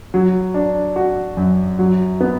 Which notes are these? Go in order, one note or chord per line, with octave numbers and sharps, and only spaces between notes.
F#3
D4
F#4
F#2
F#3
B3